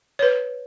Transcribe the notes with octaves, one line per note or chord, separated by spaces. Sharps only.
C#5
B4